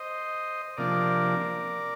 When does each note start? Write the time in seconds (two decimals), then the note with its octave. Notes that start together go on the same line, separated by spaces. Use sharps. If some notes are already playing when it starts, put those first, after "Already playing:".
Already playing: C5 D#5
0.77 C3 F3 A#3 D4 A#4 D5